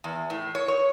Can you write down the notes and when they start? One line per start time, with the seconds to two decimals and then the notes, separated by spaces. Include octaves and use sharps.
0.04 E2
0.30 A2
0.55 C#5
0.68 C#5